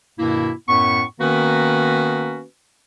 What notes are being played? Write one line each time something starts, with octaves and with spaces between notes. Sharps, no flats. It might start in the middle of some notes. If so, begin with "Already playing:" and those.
G2 B2 D#3 A#3 E4
F#2 A2 B3 C#6
D#3 A#3 B3 C#4 F#4 B4